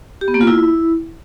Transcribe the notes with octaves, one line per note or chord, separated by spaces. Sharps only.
G4
B3
A#3
F4
E4